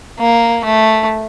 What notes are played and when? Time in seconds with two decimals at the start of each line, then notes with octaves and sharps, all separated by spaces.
0.19 A#3
0.64 A3